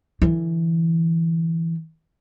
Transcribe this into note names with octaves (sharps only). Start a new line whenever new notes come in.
D3 E3